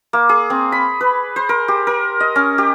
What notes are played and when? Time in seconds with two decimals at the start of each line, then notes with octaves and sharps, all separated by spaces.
0.13 A#3
0.29 G#4
0.50 C4
0.72 B5
1.01 B4
1.36 C5
1.49 A#4
1.68 G4
1.87 A#4
2.20 D#5
2.36 C#4
2.58 G4